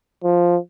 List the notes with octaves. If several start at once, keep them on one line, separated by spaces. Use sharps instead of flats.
F3